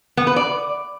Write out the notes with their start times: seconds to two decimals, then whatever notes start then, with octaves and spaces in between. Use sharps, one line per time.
0.17 B3
0.27 B4
0.36 D5